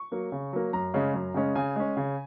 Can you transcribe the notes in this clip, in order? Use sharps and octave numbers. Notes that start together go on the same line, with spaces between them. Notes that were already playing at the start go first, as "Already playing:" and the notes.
Already playing: C#6
F#3 A#3
C#3
F#3 A#3
F#2 A#5
C#3 G#3 C#4
F#2
C#3 G#3 C#4
C#3 G#5
G#3 C#4
C#3